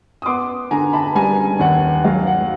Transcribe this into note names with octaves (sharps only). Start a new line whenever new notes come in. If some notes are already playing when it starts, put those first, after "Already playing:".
D#6
B3 C6 D6
D3 G#5 A#5
A5 B5
G3 G#5 A#5
D#2 F#5
F#3 F5
F#5